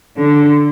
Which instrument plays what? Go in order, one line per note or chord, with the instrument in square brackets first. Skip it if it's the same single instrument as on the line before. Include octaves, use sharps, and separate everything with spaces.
[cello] D3